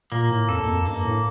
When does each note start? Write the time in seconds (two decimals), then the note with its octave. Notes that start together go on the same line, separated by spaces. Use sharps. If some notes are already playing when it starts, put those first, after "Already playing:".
0.12 A#2 A#3
0.30 A2
0.49 F2 A4
0.60 E2
0.68 F2
0.86 G2 A#3
1.05 A2